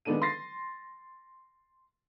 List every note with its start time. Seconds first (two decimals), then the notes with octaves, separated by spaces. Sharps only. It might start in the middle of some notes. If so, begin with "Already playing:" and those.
0.05 D#3 G#3 B3 D4 A4 D#7
0.22 C6 A6 A#6 C7